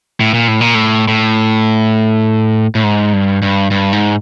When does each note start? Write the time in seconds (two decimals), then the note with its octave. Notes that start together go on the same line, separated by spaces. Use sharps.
0.21 A2
0.34 A#2
0.48 A2
0.61 A#2
0.75 A2
1.08 A2
2.75 A2
2.84 G#2
3.13 G2
3.42 G2
3.71 G2
3.93 G#2